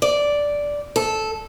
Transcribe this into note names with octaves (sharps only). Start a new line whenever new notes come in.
D5
A4